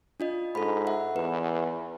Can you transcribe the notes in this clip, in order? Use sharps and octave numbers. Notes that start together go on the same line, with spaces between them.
D4 F4 D#5
G#2 A4 B5
E5 F#5
E2 B4